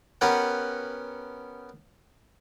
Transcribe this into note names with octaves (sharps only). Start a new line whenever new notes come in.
B3 C#4 G4 A#4 B4 F#5